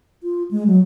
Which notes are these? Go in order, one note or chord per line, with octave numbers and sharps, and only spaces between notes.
F4
G#3
F#3